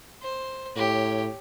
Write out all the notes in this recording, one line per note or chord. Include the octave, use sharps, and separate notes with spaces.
C5
A2 G4 C#5